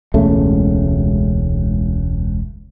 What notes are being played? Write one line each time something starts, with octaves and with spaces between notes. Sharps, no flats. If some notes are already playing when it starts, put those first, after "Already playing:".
E1 C#2 C#3 A3